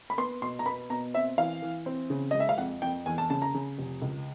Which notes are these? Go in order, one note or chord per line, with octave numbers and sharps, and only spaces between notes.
B5
B3 C6
B2 C6
A#5
B3 B5
B2 A#5
C4 E5
E3 F5
E3
C4
C#3
G#3 D#5
E5
F5
F2 F#5
F2 G5
E2 G#5
A5
C#3 A5
A#5
C#3
F1
C#2